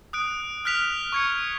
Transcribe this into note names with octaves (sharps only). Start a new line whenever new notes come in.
D#6 F#6 D7
F6 F#6 B6 F7
C#6 G#6 C#7